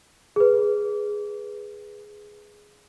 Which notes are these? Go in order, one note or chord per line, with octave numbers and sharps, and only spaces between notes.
G#4 B4